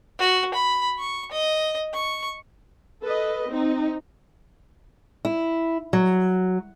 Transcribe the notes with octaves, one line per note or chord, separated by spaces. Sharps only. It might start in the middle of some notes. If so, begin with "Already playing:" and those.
F#4
B5
C#6
D#5
C#6
A4 B4 D#5
C4 D#4
E4
F#3